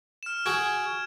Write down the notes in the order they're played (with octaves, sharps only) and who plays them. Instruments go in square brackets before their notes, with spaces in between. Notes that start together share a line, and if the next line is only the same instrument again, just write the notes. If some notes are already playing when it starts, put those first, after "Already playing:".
[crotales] F6 E7
[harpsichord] F#4 G#4 [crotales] G#6 D7 E7